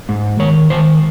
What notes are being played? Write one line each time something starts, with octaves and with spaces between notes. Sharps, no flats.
G#2
D#3 C#5
D#3 C5